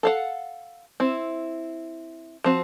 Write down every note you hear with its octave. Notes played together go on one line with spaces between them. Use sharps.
A4 F5 F#5
C4 E4
F3 C4 F#4